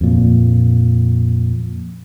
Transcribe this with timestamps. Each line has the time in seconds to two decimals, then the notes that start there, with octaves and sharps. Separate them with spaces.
0.01 F2 A#2